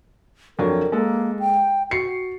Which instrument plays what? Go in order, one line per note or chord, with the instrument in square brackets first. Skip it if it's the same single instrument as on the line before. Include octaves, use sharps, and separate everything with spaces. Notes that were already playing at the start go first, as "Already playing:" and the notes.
[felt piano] F2 F#3 D4 [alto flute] A#4
[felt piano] G#3 A4 [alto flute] A#3
[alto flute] G5
[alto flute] F#4 [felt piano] C7 C#7